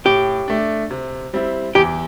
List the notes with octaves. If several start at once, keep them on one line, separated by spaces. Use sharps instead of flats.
A2 G4
A3 D4
C3
G3 C4 E4
E2 G4